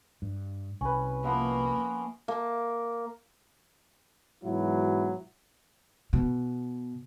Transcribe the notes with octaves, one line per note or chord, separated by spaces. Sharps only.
G2
C2 C#4 B4
F3 A#3 B3 E5
A#3
G#2 B2 E3 F#3 E4
B2